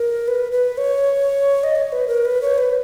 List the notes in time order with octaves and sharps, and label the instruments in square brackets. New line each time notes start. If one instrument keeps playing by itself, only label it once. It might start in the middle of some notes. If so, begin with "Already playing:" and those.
Already playing: [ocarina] A#4
B4
B4
C#5
D#5
C#5
B4
A#4
B4
C#5
B4